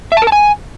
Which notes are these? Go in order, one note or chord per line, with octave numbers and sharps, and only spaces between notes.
E5
A5
A#4
A5
G#5